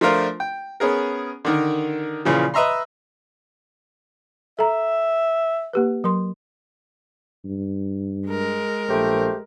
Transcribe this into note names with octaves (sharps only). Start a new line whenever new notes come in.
F3 A3 D4 F4 A#4 C5
G5
B3 C#4 G#4 A#4
D3 D#3 A#4
A#2 C#3 E3 F3
B4 D#5 E5 A#5 C6
A4 E5 A#5
A#3 G4 B4
F#3 A#4 C6
G2
G#3 A#4
A#1 A3 G4 C5